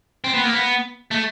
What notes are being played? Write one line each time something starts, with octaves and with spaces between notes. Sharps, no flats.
C4
B3
A#3
B3
A3